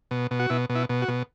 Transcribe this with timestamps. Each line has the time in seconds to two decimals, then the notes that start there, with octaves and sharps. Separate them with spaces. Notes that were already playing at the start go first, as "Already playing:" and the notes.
0.11 B2
0.31 B2
0.39 F#4
0.50 B2 E4
0.69 B2
0.75 E4
0.89 B2
1.02 F#4
1.08 B2